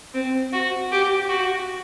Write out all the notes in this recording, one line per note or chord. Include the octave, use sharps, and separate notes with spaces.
C4
F#4
G4
F#4